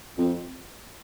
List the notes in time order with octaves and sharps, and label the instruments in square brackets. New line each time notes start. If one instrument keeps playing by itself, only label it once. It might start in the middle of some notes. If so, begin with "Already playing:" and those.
[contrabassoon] F2